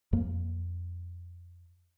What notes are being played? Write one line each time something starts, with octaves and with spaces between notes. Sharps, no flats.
F2 A#3